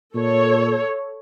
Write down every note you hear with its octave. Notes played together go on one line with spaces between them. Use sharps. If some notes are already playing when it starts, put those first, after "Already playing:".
A#2 A4 C#5